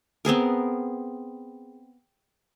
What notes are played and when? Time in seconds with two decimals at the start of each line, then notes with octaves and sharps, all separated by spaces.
0.25 B3 C4 G#4 A#4